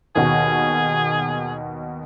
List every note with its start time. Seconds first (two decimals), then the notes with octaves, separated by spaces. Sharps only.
0.16 D#2 B2 G#4